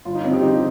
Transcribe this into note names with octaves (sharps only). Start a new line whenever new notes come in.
G1 F4
D#4
F2 C#3 C4
G4
G1 D#4